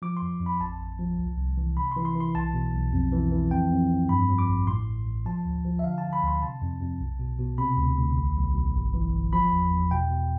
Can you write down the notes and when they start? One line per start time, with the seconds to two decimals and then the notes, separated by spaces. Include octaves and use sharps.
0.02 F3 D6
0.17 C6
0.22 F2
0.41 F2
0.46 B5
0.60 A1 A5
0.80 A1
0.99 F3
1.19 C2
1.38 C2
1.57 E3
1.77 C3 B5
1.92 C6
1.97 E3
2.05 C6
2.15 E3
2.20 C6
2.35 B1 A5
2.54 B2
2.74 B1
2.93 F2
3.12 E3
3.31 E3
3.51 F2 G5
3.70 F2
3.90 F2
4.09 G2 B5
4.28 F3
4.39 D6
4.48 A1
4.67 A2 C6
4.87 A1
5.06 A1
5.26 F3 A5
5.45 D2
5.64 F3
5.79 E5
5.83 D3 F5
5.98 A5
6.03 D3
6.13 B5
6.23 D2 C6
6.42 C3 A5
6.62 F2
6.81 F2
7.00 B1
7.19 B2
7.39 B2
7.58 C3 B5
7.77 D2
7.97 D2
8.17 B1
8.36 B1
8.55 B1
8.74 G1
8.94 E3
9.14 G1
9.33 F3 B5
9.52 E2
9.72 E2
9.91 B2 G5
10.10 B2